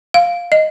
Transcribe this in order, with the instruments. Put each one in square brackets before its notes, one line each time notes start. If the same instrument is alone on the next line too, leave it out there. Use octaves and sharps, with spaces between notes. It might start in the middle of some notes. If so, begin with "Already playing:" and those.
[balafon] F5
D#5